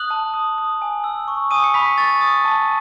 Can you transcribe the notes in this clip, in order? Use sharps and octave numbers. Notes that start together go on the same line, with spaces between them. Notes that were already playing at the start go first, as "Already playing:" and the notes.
Already playing: D#6 F#6 F#7
A5
D#6
D#6
G#5
E6
C#6
G#5 D#6 D#7
C#7
B5 C#6 B6
C#6 A6
D#6
A5